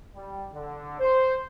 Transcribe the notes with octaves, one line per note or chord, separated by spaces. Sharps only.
G3
D3
C5